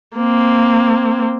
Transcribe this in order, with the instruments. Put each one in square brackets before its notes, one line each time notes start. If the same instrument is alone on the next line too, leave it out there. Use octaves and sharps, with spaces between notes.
[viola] A#3 C4